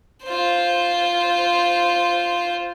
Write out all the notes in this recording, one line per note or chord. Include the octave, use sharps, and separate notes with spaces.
F4 C5